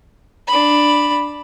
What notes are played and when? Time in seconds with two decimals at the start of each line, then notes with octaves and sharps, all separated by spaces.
0.47 D4 B5